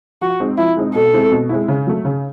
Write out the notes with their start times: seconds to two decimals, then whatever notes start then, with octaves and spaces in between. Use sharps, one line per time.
0.21 F3 F#4
0.40 G#3 C4 D#4
0.58 F3 E4
0.77 G#3 C4 D#4
0.95 B2 A4
1.13 G#3 C4 E4
1.32 B2
1.49 G#3 C4 E4
1.68 C#3
1.87 F#3 A3
2.05 C#3